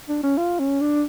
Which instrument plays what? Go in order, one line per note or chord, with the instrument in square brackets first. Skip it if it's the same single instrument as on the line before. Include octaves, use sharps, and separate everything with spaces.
[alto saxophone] D4
C#4
F4
C#4
D4